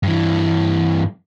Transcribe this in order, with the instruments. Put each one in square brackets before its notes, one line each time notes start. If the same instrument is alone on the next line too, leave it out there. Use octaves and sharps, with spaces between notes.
[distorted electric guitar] G2 E3